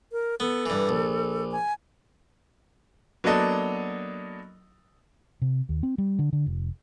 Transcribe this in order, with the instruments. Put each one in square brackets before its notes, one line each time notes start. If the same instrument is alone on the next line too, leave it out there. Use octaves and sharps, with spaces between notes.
[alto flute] A#4
[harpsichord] B3 [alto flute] A4
[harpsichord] G2 E3
A#1
[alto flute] G#5
[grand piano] F#3 A#3 B3 D4 A4 D#5
[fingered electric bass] C3
D#2
C4
G3
D3
D3
F1